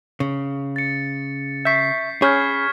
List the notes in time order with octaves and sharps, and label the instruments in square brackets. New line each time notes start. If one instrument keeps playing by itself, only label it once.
[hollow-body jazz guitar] C#3
[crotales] A6 C#7
[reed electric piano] E5 C#6 [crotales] G6 B6 C7
[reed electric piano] C#4 B5 G6 [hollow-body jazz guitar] G#4 [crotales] C#6 F6 G#6